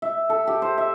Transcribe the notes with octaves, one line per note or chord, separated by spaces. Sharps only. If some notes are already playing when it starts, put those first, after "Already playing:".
E5
A4
G4
C5
E5